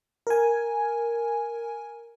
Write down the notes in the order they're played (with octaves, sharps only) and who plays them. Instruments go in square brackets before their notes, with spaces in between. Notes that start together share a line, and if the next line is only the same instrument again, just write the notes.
[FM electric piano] A#4 G#5